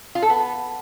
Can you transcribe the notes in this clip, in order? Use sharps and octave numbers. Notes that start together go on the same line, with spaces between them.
F4
A4
B3